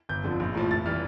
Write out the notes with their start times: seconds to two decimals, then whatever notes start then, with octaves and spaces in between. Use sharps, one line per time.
0.09 G1 G6
0.24 F2 D3 F3
0.40 A#1
0.55 A2 F3
0.70 F1 A6
0.86 E3 G3 F6